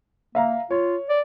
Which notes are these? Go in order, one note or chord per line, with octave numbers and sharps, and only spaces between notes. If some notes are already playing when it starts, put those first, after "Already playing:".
A#3 E5 F5 A#5
F4 C#5
D5